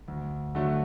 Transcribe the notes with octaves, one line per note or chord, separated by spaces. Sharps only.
D2
D3 F#3 A3